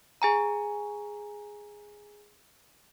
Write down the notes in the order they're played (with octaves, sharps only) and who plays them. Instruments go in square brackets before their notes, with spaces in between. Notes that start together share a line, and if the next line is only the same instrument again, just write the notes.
[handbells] G#4 G#5 A#5